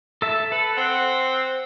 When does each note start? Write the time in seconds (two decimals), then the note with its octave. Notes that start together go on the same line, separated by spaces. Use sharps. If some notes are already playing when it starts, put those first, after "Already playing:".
0.22 A4 E5 A5
0.52 A4 B4
0.77 C4 F#5